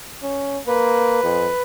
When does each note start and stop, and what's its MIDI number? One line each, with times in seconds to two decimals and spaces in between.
0.23 0.58 61
0.67 1.21 58
0.67 1.63 71
1.24 1.48 41